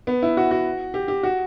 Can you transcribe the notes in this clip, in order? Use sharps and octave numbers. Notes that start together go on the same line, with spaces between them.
B3
E4
F#4
F#4
G4
G4
F#4